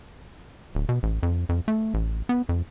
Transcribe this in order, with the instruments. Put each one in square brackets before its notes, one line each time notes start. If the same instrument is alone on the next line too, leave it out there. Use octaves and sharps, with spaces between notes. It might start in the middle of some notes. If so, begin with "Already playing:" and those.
[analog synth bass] D1
B2
A1
F2
F2
A3
A1
B3
F2